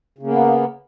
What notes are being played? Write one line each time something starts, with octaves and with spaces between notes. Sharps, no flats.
C#3 A#3 B3